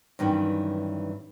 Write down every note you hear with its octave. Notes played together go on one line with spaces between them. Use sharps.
G2 D#3 E3 F#3 C#4